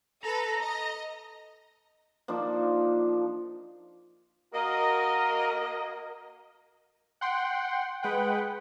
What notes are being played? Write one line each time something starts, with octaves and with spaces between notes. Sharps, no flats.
A4 B4 A#5
D#5
F3 A#3 D4 D#4
A#3 F#4 A#4 D#5
F#5 G5 C6
G#3 B4 F#5 G5